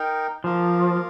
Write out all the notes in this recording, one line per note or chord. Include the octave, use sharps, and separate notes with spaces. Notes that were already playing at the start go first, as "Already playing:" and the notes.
Already playing: D#4 A#4 G5
F3 A#3 F4 A#4 F5